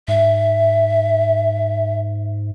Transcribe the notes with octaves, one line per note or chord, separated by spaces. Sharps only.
G#2 E5